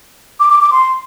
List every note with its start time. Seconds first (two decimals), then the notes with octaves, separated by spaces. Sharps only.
0.40 D6
0.50 D6
0.61 D6
0.72 C6